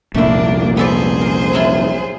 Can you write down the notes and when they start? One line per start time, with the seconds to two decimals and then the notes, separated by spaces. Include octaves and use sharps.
0.14 C2 F2 A#2 A3 A#3 D4 E4
0.77 B3 G#4 A4 C5 D5
1.21 A#4
1.53 F#3 E4 F4